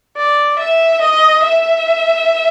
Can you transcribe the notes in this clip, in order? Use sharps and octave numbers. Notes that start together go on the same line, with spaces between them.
D5
E5
D#5
E5